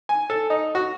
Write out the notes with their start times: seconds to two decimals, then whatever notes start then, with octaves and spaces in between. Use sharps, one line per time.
0.09 G#5
0.30 A4
0.50 D#4
0.75 F#4